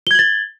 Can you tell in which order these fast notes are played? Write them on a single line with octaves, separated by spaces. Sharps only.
G7 G#6 F#7 A6